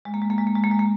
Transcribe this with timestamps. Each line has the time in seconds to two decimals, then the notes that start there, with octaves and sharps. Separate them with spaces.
0.05 G#3
0.14 A#3
0.22 G#3
0.30 A#3
0.38 G#3
0.47 A#3
0.55 G#3
0.64 A#3
0.71 G#3
0.79 A#3